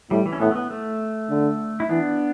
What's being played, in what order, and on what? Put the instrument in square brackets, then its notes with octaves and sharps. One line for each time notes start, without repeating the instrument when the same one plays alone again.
[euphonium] A2 [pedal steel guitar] G3
[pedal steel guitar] E3
C#4
[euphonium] A2 [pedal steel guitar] B3
[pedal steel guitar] A3
B3
A3
[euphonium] D3
[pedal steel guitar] E4
[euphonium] E3 [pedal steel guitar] B3 D4